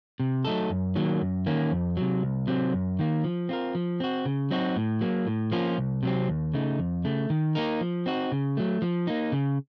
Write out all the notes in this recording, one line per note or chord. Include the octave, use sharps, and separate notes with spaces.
C3
F#3 A3 D#4 A4
F#2
D#3 F#3 A#3
F#2
D#3 A#3 C#4
F2
C3 F#3
C2
C3 F#3 C4
F#2
D#3 A#3
F3
C4 F4 A#4
F3
C4 F#4
C#3
F#3 C4 D#4 F#4
A2
F#3 A#3
A2
F3 A#3 C#4 F4
C2
C3 F#3 C4
D#2
C#3 A3 D#4
F2
C#3 A3
D#3
A#3 D#4 A#4
F3
C4 D#4 F#4
C#3
F#3 A3
F3
A#3 D#4
C#3